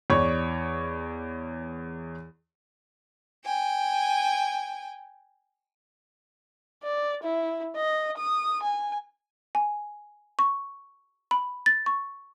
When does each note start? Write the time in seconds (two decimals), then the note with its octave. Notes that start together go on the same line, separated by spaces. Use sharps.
0.10 E2 C#5 D5 C#6
3.45 G5 G#5
6.83 D5
7.23 E4
7.76 D#5
8.18 D#6
8.63 G#5
9.55 G#5
10.39 C#6
11.31 B5
11.66 A6
11.86 C#6